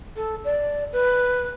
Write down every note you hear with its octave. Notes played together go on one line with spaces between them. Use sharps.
A4
D5
B4